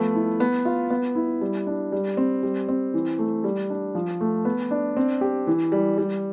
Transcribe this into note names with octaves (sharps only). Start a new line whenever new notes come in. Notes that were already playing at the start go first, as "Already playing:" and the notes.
Already playing: F3 A3 B3
E4
B3
F4
B3
E4
G3
D4
G3
C4
G3
C4
E3
A3
G3
D4
F3
A3
B3
D4
C4
G4
E3
G3
G3